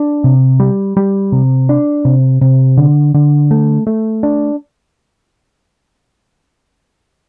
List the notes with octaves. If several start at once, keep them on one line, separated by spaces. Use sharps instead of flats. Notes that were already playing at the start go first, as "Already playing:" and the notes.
Already playing: D4
C3
G3
G3
C3
D4
C3
C3
D3
D3
A3
A3
D4